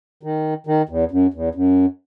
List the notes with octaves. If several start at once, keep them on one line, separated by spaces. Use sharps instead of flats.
D#3
D#3
E2
F#2
E2
F#2